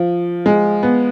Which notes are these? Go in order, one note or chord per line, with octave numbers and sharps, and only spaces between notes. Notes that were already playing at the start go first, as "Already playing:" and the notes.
Already playing: F3
G#3
B3